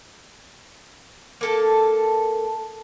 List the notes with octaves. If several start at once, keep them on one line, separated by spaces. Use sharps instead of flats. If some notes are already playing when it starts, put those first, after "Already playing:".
A#3 A4 A5